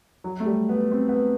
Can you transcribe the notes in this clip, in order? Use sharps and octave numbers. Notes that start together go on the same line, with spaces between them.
F#3
A3
G3
B3
C4
B3